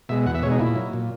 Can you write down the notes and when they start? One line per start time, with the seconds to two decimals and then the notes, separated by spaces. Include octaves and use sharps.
0.09 B2 G#3 E5
0.26 E2 F#5
0.35 E5
0.43 B2 G#3 C#5
0.51 D#4
0.59 A#2 E4
0.76 F#3
0.93 A#2